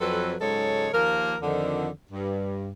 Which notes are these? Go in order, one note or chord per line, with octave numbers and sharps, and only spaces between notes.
F2 F#3 C4 A4 B4
G#2 C#3 F#3 G#3 A4 C#5
D#2 F3 A#3 A#4
F2 D3 D#3
G2